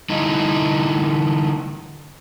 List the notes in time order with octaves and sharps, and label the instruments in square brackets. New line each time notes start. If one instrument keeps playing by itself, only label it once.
[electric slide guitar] D3 G3 D#4 E4 F5